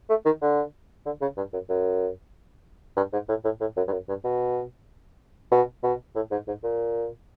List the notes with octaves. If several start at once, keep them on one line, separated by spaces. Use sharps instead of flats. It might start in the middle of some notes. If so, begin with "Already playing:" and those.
A3
D#3
D3
D3
C#3
G2
F#2
F#2
G2
G#2
A2
A2
A2
F#2
G2
F#2
G2
B2
B2
B2
A2
G#2
G#2
A#2